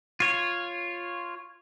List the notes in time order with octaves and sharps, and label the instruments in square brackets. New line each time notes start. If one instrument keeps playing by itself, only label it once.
[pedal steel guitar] F4 C#5